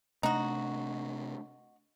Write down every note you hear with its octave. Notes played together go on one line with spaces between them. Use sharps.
C3 A3 D4 D#4 F#4